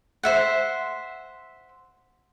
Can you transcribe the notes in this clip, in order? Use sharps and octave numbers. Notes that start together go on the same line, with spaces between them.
C5 E5 F#5